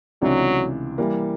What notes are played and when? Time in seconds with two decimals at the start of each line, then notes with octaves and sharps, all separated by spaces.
0.22 C#2 C3 E3 F#3 A3 D4
0.98 E3 G3 A#3